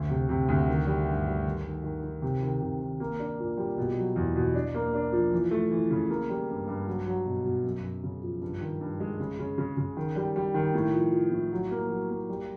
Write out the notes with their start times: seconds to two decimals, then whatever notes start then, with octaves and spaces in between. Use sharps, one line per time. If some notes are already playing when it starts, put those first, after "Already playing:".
Already playing: D2
0.09 C3
0.29 C3
0.48 D2
0.68 D#3
0.87 G3
1.07 G2
1.26 G3
1.46 D#3
1.65 D#3
1.84 D#3
2.03 D#3
2.22 C3
2.43 D#3
2.61 C3
2.81 D#3
3.00 A#3
3.20 D4
3.39 A#2
3.58 G3
3.77 B2
3.97 F#3
4.16 E2
4.36 B2
4.55 D4
4.75 A#3
4.94 D4
5.12 F3
5.33 E3
5.51 A3
5.71 E3
5.91 C#3
6.09 A#3
6.29 G3
6.48 G2
6.68 G2
6.87 F#3
7.07 F#3
7.26 B2
7.45 B2
7.65 F#2
7.84 F#2
8.03 C#3
8.23 F3
8.42 G2
8.61 D#3
8.81 G2
9.00 G#3
9.20 C#3
9.39 C#3
9.58 C#3
9.77 C#3
9.97 D#3
10.16 G3
10.36 G3
10.54 D#3
10.74 A2
10.93 F3
11.12 F3
11.31 A2
11.52 F#3
11.71 A#3
11.90 F#3
12.10 A#3
12.29 G3